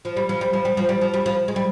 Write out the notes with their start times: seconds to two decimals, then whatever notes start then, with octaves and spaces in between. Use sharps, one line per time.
0.05 F3
0.17 G3
0.29 F3
0.41 G3
0.53 F3
0.65 G3
0.77 F3
0.89 G3
1.01 F3
1.14 G3
1.26 F3
1.48 G#3
1.56 G3